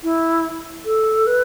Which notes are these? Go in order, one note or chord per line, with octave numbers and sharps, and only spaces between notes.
E4
A4
B4